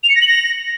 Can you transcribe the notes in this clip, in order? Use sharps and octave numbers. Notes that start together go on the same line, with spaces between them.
F7
C#7
A#6
F#7
A#6